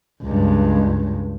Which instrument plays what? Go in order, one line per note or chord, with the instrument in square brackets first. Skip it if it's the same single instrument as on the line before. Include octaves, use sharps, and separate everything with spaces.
[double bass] C#2 G2